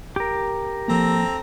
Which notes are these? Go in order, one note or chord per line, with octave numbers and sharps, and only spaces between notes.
G4 A#4
F3 A#3 C4 A4 A#5